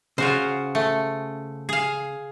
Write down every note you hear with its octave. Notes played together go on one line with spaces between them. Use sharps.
C#3 F4 F#4 C5
A3
G#4 F5